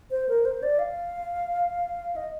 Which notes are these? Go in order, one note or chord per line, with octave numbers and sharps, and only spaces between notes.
C5
A#4
C5
D5
F5
D#5